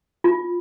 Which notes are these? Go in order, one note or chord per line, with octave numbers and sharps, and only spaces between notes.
F4